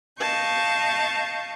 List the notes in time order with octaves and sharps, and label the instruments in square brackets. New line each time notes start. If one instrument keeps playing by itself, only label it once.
[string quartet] D#5 F5 A5 C#6 G6